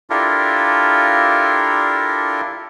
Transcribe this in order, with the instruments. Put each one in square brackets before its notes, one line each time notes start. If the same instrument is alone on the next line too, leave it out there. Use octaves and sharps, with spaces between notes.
[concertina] D4 E4 F4 G4 A4 A#4